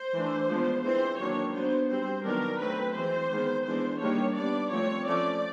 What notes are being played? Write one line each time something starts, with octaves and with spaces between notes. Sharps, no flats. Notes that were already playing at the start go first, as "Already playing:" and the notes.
Already playing: C5
E3 A3 D4
F3 G#3 B3 D4
E3 G#3 C4 C5
D#3 F#3 A#3 D4 C#5
F#3 B3 D4 C5
G3 C4 C5
D#3 F#3 B3 D4 A#4
F#3 A3 C4 B4
E3 G#3 C4 C5
D#3 G#3 B3
E3 G#3 B3 D4 C5
D#3 G3 A#3 D4 C#5
G3 B3 D4 D5
F3 A3 C4 C#5
F3 A3 C#4 D5